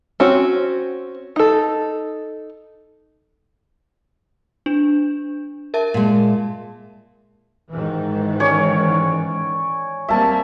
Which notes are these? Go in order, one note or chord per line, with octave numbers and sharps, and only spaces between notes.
C4 C#4 F#4
D#4 A4
D4
A#4 E5 A5
A#2 G#3
G#2 D#3 E3
C#4 C#5 D5
G3 A#3 C4 E5 A5